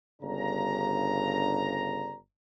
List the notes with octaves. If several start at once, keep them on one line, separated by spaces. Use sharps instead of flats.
G1 G2 C#3 D4 A#5